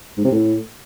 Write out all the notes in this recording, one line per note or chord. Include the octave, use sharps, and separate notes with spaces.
G#2
C3
A2